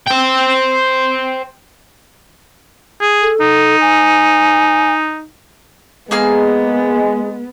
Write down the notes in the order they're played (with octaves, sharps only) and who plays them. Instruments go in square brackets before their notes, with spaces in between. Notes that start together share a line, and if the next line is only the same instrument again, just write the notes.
[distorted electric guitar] C5 G5
[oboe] G#4
[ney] A4
[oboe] D#4
[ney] G#5
[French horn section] G#3 [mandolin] A#3 G#4 F6 [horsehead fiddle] B3